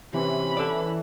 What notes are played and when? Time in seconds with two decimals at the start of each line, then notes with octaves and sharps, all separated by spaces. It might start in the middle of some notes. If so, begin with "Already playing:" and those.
0.14 C3 E3 C#4 B5
0.57 A4 D5